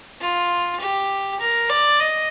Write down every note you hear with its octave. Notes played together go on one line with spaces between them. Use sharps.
F4
G4
A#4
D5
D#5